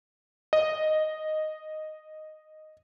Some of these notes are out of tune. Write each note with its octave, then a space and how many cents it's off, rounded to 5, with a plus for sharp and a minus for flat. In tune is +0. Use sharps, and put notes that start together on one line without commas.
D#5 -5